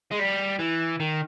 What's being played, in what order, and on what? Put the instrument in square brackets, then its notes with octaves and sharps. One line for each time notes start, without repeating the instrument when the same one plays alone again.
[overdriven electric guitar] G#3
G3
E3
D#3